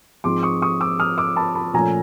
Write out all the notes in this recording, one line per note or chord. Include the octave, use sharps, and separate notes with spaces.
G#2 F3 G#3 C4 C6 D6
C#6 D#6
C#6 D#6
D6 E6
D#6 F6
D6 E6
A5 B5
A5 B5
A#2 F3 A3 C#4 G#5 A#5